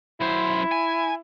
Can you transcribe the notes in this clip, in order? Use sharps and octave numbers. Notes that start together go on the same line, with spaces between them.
F#2 E4 C5
G#5